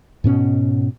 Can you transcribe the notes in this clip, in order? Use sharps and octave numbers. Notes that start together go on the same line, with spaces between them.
G#2 B2 C#4